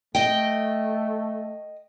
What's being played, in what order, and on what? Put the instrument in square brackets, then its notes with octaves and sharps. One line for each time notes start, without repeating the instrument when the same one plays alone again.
[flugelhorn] A3 [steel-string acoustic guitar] D#5 G5